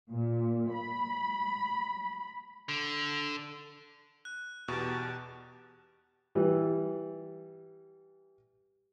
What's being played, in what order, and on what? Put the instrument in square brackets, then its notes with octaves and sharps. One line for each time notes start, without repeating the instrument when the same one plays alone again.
[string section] A#2
B5
[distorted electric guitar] D3
[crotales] F#6
[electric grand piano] E2 B2 C#6 [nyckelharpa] G4 A5
[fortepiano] E3 G3